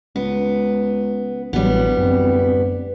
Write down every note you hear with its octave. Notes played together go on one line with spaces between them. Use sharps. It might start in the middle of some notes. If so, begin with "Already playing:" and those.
C#2 B3
D1 A1 F#3 G3 B3
F#2 C4